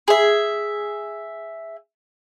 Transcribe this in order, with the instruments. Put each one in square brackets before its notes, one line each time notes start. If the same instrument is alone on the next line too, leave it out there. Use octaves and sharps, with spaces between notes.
[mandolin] G#4 E5